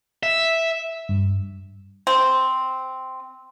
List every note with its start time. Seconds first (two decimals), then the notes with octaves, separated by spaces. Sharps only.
0.23 E5
1.09 G2
2.07 C4